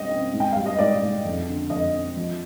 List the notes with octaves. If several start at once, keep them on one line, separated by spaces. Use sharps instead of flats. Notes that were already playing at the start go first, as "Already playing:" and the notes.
Already playing: G3 C4 D#5 F5
C4
G#2
G5
G3 F5
D#5
G#2 D5
G#2
F2
D3
F2 D#5
C4
F3